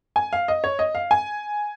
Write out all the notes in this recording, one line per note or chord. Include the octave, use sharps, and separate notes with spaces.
G#5
F5
D#5
C#5
D#5
F5
G#5